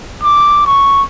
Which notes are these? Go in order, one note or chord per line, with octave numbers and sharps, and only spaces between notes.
D6
C#6